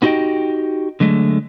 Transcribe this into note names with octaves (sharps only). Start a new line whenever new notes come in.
B3 D#4 F#4 G4 D#5 G5
D3 F#3 G#3 A3